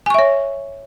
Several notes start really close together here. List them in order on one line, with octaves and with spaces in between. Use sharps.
G#5 C#6 E5 C#5